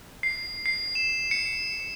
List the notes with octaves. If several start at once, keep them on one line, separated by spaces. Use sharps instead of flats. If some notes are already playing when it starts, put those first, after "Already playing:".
C7
C7
E7
C#7